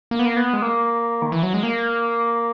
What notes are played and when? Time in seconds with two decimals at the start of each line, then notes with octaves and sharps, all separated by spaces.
0.11 A#3
0.19 B3
0.26 A#3
0.37 B3
0.53 G#3
0.62 A#3
1.22 D#3
1.32 E3
1.43 F#3
1.54 G#3
1.63 A#3